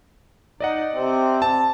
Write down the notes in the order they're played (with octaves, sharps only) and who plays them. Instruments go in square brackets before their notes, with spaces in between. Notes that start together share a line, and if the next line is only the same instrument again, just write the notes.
[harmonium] D#4 [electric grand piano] D5 D#5 F#5
[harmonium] C3 C4
[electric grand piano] A5